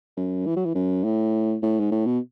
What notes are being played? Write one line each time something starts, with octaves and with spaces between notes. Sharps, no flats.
F#2
E3
F#3
E3
F#2
A2
A2
G#2
A2
B2